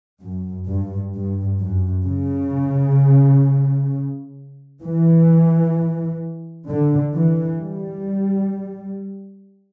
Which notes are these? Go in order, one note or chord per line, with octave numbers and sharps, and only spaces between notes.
F#2
G2
G2
F#2
C#3
E3
D3
E3
G3